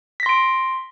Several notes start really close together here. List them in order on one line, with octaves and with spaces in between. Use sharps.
B6 A#6 C6 D7